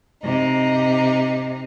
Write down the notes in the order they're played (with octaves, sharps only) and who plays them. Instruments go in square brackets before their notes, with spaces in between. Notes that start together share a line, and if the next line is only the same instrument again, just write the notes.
[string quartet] C3 D#4